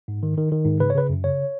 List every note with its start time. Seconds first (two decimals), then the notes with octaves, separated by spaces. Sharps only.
0.08 G#2
0.23 D#3
0.37 D#3
0.52 D#3
0.65 G#2
0.80 C#3 B4
0.90 C#5
0.95 C#3 B4
1.09 F#2
1.24 C#3 C#5